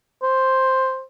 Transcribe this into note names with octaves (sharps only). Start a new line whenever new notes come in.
C5